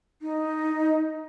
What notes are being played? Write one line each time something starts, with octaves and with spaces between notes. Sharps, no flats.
D#4